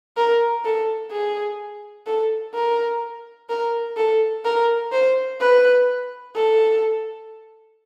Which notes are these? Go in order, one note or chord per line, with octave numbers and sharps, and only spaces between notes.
A#4
A4
G#4
A4
A#4
A#4
A4
A#4
C5
B4
A4